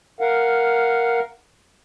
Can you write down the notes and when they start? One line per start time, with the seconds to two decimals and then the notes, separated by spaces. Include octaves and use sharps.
0.20 A#4 F5 F#5